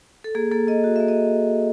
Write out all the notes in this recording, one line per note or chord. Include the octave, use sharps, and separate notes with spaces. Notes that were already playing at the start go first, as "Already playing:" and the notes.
A4
A#3 G#4
A#3 A4
A#3 D#5
F#4
E5
A#3
D#5